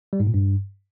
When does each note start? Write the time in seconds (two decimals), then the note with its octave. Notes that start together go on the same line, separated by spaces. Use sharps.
0.13 G3
0.20 G#2
0.27 A#2
0.34 G2